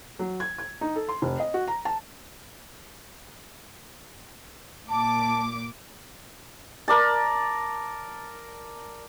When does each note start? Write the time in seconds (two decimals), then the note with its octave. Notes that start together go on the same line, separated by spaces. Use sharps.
0.19 F#3
0.40 G#6
0.58 G#6
0.81 D#4
0.96 A4
1.09 C6
1.22 F1
1.40 D#5
1.54 F#4
1.68 A#5
1.85 A5
4.90 A#2 A5 D6
6.88 A#4 D5 A5